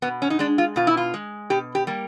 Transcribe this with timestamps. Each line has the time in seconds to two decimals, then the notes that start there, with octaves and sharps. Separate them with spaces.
0.02 B2 B3
0.22 C#4
0.30 D#4
0.39 G#3 D4
0.58 F4
0.76 B2 F4
0.87 E4
0.97 F4
1.14 G#3
1.50 B2 G4
1.75 G4
1.87 G3 A#3